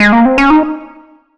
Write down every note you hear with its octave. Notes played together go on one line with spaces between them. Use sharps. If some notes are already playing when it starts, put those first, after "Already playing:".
G#3
A#3
C4
C#4
D#4